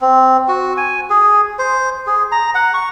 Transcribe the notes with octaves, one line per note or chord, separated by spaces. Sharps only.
C4
F#4
G#5
G#4
C5
G#4
A#5
F#5
C#6